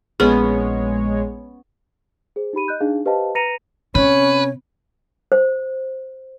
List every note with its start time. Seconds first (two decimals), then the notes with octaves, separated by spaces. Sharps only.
0.20 A#1 G#3 B3 C#4 G#4 C#5
2.36 G#4 C5
2.53 D#4 G4 B5 D#7
2.68 D#5 F#6 G6
2.80 D4 D#4 G#4 F5
3.05 G4 B4 C5 D#5 F5 A5
3.35 B4 A#5 A#6 C#7 D#7 F7
3.95 C3 C#4 B4 C#5
5.32 C5